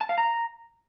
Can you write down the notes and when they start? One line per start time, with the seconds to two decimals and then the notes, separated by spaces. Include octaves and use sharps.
0.01 A5
0.09 F5
0.18 A#5